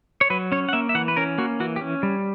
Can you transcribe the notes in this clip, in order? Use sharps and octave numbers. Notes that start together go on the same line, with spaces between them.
C#5
F#3 B4
C#4 C#5
F#5
A#3 E5
E5
E3 F#5
B4
C#4 A#4
A#3 F#4
E3 F#4
G4
C#4
G3